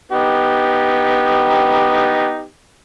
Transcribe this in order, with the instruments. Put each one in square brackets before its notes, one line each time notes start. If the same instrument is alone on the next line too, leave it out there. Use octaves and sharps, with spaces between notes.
[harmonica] B3 D#4 G4